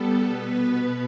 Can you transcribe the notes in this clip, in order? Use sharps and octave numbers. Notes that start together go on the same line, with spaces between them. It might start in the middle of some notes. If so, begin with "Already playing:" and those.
Already playing: G3 B3 A4
B2 B3 B4